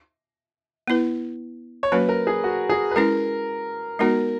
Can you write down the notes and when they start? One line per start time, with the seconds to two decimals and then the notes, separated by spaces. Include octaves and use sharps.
0.87 B3 E4 B4
1.83 C#5
1.92 F#3 A#3 C#4 F#4 B4
2.09 A#4
2.27 G#4
2.44 F#4
2.69 G#4
2.91 B4
2.96 G#3 C#4 E4 A#4
3.99 G#3 B3 D#4 F#4 A#4